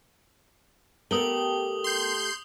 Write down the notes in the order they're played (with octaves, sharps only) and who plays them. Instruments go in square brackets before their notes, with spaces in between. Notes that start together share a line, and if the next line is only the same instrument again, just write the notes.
[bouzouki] A3 G4 A4 [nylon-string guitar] B3 A#4 [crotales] D#6 F#7 G7
[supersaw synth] C6 G6